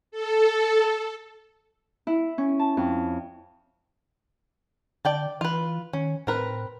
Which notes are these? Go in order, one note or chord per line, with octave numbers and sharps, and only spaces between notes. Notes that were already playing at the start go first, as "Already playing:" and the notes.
A4
E4
C#4
A5
F2
D3 D5 G5 A5
E3 F4 B4
D#3 C#4
A2 C4 A#4 B4